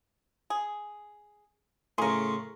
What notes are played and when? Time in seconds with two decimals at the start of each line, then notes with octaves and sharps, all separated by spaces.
0.50 G#4
1.98 A2 C#3 G#4 A#4 C6 C#6